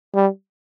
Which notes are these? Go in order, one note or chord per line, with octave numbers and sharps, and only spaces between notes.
G3